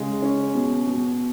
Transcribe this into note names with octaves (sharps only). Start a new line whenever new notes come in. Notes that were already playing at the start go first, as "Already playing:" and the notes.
Already playing: C#3 G#3
C#4
B2
B2